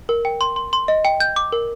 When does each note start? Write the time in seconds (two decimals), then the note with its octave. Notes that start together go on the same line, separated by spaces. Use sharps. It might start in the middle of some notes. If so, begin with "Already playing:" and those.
0.09 A#4
0.25 G5
0.41 C6
0.56 C6
0.73 C6
0.88 D#5
1.05 G5
1.20 G6
1.36 D6
1.52 A#4